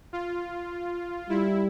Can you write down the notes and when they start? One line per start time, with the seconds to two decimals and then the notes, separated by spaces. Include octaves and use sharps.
0.13 F4
1.29 G3 E4